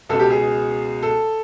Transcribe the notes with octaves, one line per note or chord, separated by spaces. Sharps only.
C#2 B2 A4
G4
G#4
A4